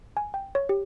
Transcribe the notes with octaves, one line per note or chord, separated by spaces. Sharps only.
G#5
G5
C#5
G4